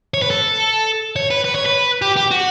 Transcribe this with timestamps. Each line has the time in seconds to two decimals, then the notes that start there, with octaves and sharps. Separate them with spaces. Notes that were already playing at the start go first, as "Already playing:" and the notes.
0.14 C#5
0.22 B4
0.30 A4
1.16 C#5
1.31 B4
1.45 B4
1.55 C#5
1.66 B4
2.02 G4
2.16 G4
2.31 F#4